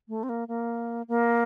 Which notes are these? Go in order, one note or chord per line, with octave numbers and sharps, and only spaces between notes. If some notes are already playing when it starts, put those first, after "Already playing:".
A3
C4
A#3
A#3
A#3